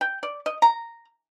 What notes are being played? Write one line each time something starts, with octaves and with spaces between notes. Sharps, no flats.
G5
D5
D#5
A#5